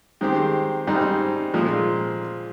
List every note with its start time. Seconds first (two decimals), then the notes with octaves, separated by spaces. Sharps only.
0.21 D#3 G#3 C4 G4
0.87 G#2 G3 C4 D#4
1.54 A#2 F3 G#3